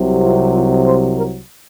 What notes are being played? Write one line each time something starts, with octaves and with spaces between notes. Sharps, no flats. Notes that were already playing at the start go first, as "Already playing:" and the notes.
Already playing: C2 C3 F#3
F4
F4
C5
A#4